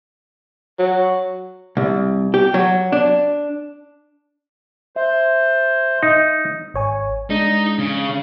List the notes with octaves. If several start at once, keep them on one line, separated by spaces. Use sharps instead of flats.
F#3
C2
G4
F#3
D4
C5 E5
D#4
G#1 C#5 G#5
G#3 D4 D#4
C#3